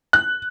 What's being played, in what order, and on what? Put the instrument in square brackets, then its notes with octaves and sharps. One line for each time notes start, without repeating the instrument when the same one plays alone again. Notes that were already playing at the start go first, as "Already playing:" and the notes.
[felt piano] F#6